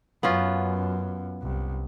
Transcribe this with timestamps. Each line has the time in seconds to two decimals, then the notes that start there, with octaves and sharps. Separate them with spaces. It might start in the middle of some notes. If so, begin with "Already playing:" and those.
0.23 F#2 B3 C#4 F4
1.42 C2